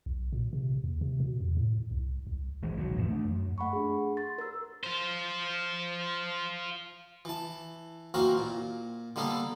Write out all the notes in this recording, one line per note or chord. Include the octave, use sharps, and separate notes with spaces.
B1
A#2
C3
D#2
C3
B2
E2
A2
C2
C2
D#3 E3 G#3
C2 B2 F3 F#3
F2 A2 E3 F3
A3 D4
F#2
A3 F#5 B5 C#6
D4 G#4
C6 A6
A#4 E6
F4 C5
E3 A5
E3 A#3 C4 F#4 A#4
A#2
D3 G3 A#3 B3 A4